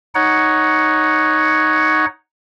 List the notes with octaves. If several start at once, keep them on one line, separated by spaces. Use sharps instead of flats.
D#4 C#5 F#5